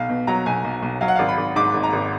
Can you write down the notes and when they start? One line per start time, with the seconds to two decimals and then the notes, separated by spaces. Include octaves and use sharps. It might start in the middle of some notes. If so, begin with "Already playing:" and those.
Already playing: B1 F5
0.09 B2
0.27 F#3 A#5
0.46 B1 G#5
0.64 B1
0.82 B1
1.01 F#3 F5
1.08 F#5
1.16 G#1 F5
1.29 B5
1.38 G#1
1.56 G#2 D6
1.74 G#1
1.83 A#5
1.93 G#1